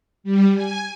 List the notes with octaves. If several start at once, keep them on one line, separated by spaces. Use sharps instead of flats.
G3
G#5